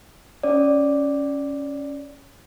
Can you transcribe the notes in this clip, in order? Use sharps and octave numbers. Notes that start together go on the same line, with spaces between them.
C#4 C#5 D5